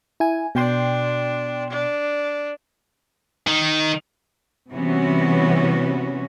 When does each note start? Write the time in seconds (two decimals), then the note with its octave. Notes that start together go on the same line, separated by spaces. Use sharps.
0.20 E4 G#5
0.55 B2 D4 G5 C6
1.70 D4
3.47 D#3
4.71 C3 E3 G3 B3 C#4 F#4